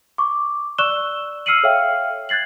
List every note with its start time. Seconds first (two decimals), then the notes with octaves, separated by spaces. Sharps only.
0.18 C#6 D6
0.78 D5 C#6 E6 F#6 E7 G7
1.46 E6 F6 C7 C#7 D#7 F#7
1.63 A4 C#5 E5 F5 G5 F6
2.29 F#6 G#6 A6 C7 F#7